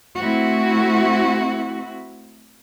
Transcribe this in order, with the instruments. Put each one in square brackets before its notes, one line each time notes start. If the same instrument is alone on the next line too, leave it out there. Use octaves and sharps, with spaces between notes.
[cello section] A3 C4 E4 F#4